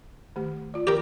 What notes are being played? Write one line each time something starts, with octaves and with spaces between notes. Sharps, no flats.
D#3 A3 G4
F4 D5
G4 A#4